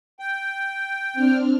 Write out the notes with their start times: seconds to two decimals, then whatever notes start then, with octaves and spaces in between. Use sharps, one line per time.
0.19 G5
1.13 C4 D4 F6